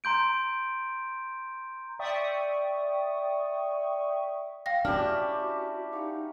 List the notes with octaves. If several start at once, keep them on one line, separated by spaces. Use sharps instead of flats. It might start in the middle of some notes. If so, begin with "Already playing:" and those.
A#5 C6 G6 D7
D5 E5 G5 C#6 D#6
F5 G5 A#6
C#4 D4 E4 F#4 G4 F6
D#4 F#4 G4 F5